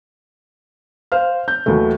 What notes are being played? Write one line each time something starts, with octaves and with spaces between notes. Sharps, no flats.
C5 F5 F6
G6
D#2 E3 F#3 A3